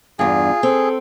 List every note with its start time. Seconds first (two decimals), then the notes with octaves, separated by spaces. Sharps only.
0.19 E2 G2 F4 G#4
0.63 C4 A4